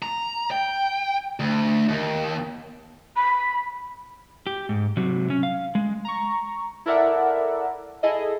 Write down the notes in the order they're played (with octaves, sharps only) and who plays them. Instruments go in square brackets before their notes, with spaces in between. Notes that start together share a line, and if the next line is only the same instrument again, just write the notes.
[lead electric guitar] A#5
G5
D2
D#2
[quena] B5
[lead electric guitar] G4
G#2
C3 F#3
C#4
F5
G#3
[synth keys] A#5 C#6
E4 A4 A#4 D5 E5 F#5
E4 G#4 A4 D#5